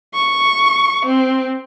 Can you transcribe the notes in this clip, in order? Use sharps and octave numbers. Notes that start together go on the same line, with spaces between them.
C#6
C4